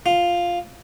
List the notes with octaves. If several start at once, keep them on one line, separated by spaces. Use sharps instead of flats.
F4